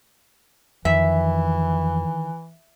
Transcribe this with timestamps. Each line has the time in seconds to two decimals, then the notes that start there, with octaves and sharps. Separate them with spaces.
0.85 F2 D#3 E3 E5